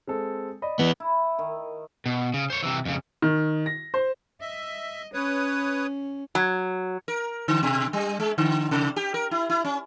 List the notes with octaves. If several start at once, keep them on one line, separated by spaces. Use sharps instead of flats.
G#3 C4 A4
D5 D#5 B5
E3 B3
E4
D#3
B2
C#3
C5 C#5
C3 E3
F2 C#3
D#3
A#6
C5
D#5 E5
C#4 B4 C#5 D#6
F#3
A#4
D3
B2
G3
G#3
D3
C3
G4
A#4
E4
E4
C#4